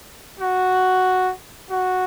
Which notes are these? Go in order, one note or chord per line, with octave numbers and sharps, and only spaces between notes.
F#4
F#4